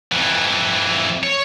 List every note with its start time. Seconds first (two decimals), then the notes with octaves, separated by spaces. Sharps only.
0.12 F2 E3
1.23 C#5